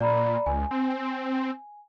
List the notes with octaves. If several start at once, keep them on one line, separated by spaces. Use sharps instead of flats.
A#2 D5 A#5 B5
C#2 G#5
C4